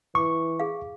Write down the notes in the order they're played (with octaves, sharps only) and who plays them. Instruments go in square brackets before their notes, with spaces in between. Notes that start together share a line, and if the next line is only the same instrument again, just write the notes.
[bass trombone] E3 [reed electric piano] C#6 [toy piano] D6
[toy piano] G#4 F5